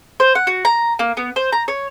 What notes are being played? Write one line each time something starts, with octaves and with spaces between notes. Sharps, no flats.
C5
F#5
F#4
A#5
A#3
B3
C5
A#5
C#5